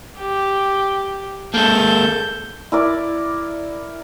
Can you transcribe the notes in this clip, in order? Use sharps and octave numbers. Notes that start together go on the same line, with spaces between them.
G4
G#3 A#3 A4 G6
E4 A#4 D5